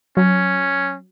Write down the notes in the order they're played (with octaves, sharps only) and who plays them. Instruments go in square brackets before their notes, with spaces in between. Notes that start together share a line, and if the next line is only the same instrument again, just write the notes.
[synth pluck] F#3 [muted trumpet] C#4